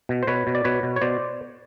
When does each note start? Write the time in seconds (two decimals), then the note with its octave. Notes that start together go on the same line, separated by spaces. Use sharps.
0.09 B2
0.23 C5
0.27 B2 B4 C#5
0.47 B2
0.55 D5
0.65 B2 B4 C#5
0.83 B2
0.96 C#5
1.02 B2 C5 D5